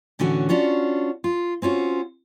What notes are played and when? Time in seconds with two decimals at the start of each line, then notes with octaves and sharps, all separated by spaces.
0.19 A2 D3 E3 C#4 F#4
0.49 C#4 D4 F4 F#4
1.24 F4
1.62 C4 C#4 F4 F#4